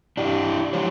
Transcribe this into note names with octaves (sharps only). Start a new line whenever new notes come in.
D4 E4 G4
F3 G#3 G4 C5 C#5